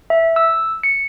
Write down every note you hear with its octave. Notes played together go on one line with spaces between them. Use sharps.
E5
E6
C#7